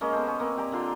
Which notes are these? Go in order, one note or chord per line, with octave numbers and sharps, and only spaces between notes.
G#3 A#3 C#4 D#5
B3 A4 C5
C#4
A#3 C4
G4 D5 G#5 A#5
D3 F4 C6